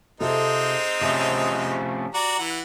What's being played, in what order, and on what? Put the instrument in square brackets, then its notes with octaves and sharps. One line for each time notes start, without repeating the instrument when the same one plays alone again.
[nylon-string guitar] C3 F4 A4 [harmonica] G#3 C4 D#4
[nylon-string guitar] C3 [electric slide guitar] F3 A3 C#4
[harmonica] F#4 D5 A#5
E3 F#5